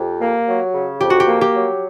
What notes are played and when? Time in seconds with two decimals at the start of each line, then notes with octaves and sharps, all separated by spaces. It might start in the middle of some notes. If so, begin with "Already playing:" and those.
Already playing: F2 G4
0.21 A#3
0.47 F#3
0.73 C#3
1.01 F2 G4
1.10 F#4
1.20 G4
1.28 A#3
1.41 G4
1.55 F#3